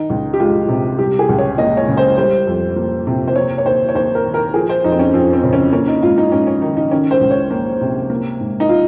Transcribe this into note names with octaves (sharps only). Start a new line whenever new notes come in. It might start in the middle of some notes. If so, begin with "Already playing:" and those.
Already playing: D#3 D#4
C#2
G4
G#3 F4
C3
G3 G4
G#4
C#2
C#5
A#3 D#5
C#5
C#3
C5
G3 C5
F2
A#3
C3
C5
A#3 C#5
C#5
D#2 C5
C#5
D#2 C5
A#4
D#3
A#4
F3 G#4
C5
F2 D#4
C4
C#4
F2 C4
C4
C#3
C#4
A#3 C#4
D#4
G#2 F4
D#4
G#2 C#4
C#4
D#3 D#4
D#4
D#3 C#4
C5
C#2
C#5
A#3
C3
A#3
G#2
D#4
F4